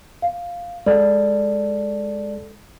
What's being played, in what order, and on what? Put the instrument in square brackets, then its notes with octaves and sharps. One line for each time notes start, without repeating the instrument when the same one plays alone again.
[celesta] F5
[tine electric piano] G#3 A4 [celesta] D5